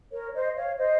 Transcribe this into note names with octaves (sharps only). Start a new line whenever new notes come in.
A#4 C#5
C5 D#5
C#5 F5
C5 D#5